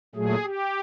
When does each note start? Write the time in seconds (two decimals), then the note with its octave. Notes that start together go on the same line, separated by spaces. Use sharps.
0.15 A#2 F#3 A3 G#4
0.43 G4